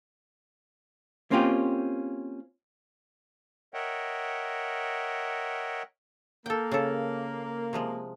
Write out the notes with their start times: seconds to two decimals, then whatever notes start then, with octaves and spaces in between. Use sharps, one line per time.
1.31 A#3 C4 C#4 F4 G4
3.74 A#4 C#5 D#5 E5 F#5 G5
6.46 A#3 A4 G5
6.72 C#3 A4
7.73 C3 F3 G#3